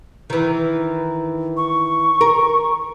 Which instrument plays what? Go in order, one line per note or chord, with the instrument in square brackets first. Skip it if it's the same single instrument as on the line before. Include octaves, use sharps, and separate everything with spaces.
[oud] D#3 E3
[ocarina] C#6
[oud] A#4